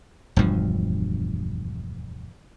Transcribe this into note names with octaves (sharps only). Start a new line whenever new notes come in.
E1 D2 G2 F3